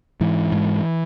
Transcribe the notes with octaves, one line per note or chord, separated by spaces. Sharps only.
G#2 E3
G#2